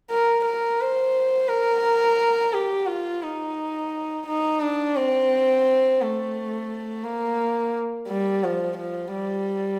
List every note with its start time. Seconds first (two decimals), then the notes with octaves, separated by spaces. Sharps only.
0.10 A#4
0.45 A#4
0.80 C5
1.49 A#4
2.54 G4
2.88 F4
3.23 D#4
4.27 D#4
4.61 D4
4.96 C4
6.01 A3
7.04 A#3
8.08 G3
8.43 F3
8.77 F3
9.13 G3